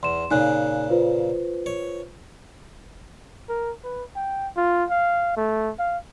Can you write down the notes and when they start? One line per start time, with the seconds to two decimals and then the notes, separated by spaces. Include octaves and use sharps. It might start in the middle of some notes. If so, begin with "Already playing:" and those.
0.03 E2 C6 E7
0.31 A#2 C#3 D#4 G#5 F#6
0.90 F4 B4 C5
1.66 C#5
3.49 A#4
3.84 B4
4.16 G5
4.57 F4
4.90 F5
5.37 A3
5.79 F5